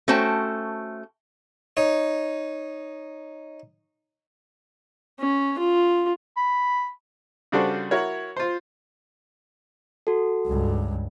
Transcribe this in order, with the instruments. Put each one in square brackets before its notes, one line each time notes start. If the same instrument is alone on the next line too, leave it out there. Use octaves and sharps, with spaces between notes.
[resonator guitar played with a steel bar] A3 C#4 F#4 C5 G5 A5
[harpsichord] D#4 C#5
[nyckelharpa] C#4
F4
[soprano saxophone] B5
[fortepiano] C#3 G3 D4 F#4 A4 C5
E4 F#4 A#4 C#5
F4 C5
[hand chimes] F#4 A4
[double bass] C#2 G2